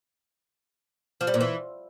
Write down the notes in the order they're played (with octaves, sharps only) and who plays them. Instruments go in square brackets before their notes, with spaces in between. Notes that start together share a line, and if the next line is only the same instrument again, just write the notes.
[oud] F3
G3
A#2
E3